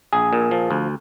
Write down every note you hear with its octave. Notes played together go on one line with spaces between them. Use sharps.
A#1 G#4
A#2
F3
D2